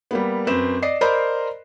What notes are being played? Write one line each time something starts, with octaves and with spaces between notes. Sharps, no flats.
G3 A#3 B3
F#2 C4 B4 E7
D5 D#5 C7
A#4 C5 D5 D#5 A#5 B5